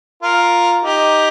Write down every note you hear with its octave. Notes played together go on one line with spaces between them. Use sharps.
F4 A#4
D#4 G4